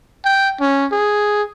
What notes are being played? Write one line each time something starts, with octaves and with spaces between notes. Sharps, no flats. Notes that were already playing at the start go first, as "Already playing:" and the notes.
G5
C#4
G#4